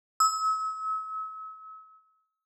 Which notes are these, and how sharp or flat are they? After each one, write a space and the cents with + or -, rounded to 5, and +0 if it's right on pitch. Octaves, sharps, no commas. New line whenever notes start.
E6 -40